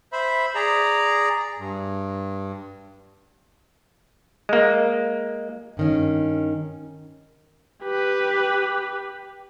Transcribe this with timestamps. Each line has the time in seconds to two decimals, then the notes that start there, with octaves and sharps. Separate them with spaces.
0.13 C5 E5 B5
0.55 G#4 D5 A#5
1.59 G2
4.49 G#3 A#3
5.77 G2 D#3 C#4
7.83 G4 B4